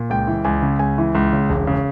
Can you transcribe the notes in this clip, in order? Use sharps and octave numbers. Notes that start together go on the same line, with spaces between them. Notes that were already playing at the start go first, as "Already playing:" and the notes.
Already playing: A#2
C#2 G5
E3
C#2 G#5
C#3
C#2 G#5
E3
C#2
C#3
E1
C#3